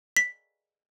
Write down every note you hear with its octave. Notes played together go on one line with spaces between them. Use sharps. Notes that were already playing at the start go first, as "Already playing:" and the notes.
B6